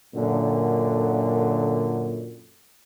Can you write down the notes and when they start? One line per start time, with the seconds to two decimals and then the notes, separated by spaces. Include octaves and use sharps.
0.15 F#2 A#2 D3